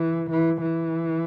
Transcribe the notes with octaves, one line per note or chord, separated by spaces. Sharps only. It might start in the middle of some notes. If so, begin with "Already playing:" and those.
Already playing: E3
E3
E3